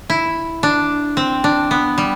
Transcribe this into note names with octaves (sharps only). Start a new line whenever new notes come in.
E4
D4
C4
D4
B3
G3